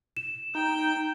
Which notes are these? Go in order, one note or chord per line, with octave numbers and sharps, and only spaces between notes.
E7
D#4 G5